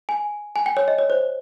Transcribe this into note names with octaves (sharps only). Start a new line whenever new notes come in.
G#5
G#5
G5
C#5
D#5
C#5
C5